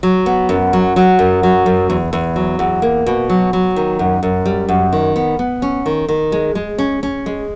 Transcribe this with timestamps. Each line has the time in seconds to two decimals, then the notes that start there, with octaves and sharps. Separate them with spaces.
0.03 F#3
0.26 B3
0.49 F#2
0.73 F#3
0.96 F#3
1.19 F#2
1.43 F#3
1.66 F#2
1.90 E2
2.13 E2
2.36 F#3
2.59 E2
2.82 A#3
3.06 B2
3.30 F#3
3.53 F#3
3.76 D#3
3.99 F#2
4.23 F#2
4.46 G3
4.69 F#2
4.93 D#3
5.16 B3
5.39 B3
5.62 C#4
5.86 D#3
6.08 D#3
6.32 G#3
6.55 G#3
6.78 C#4
7.03 C#4
7.26 G#3